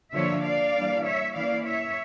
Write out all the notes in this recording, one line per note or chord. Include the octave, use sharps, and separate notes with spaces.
D3 F3 A#3 D4 F4 C#5 E5
D5 F5
E3 G3 A#3 D4
C#5 E5
E3 A#3 C#4 E4 D5 F5
C#5 E5